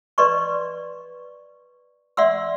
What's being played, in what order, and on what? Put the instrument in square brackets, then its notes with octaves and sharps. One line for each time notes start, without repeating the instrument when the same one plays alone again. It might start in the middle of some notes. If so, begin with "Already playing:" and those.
[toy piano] B4 D5 D#5 C6 C#6
D5 E5 F#5 C6 E6